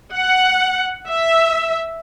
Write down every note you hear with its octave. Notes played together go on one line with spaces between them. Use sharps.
F#5
E5